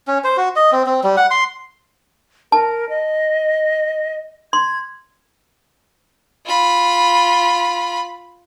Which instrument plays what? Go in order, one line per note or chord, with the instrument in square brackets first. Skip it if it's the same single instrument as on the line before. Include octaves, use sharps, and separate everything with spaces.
[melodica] C#4
C5
F#4
D#5
C4
C4
G3
F#5
C6
[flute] A#4 [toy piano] A5
[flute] D#5
[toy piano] C6 [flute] G#6
[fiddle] F4 B5